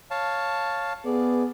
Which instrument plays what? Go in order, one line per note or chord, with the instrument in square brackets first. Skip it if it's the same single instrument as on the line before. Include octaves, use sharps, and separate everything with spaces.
[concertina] C#5 F5 A5
[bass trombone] B3 [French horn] G#4 [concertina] D5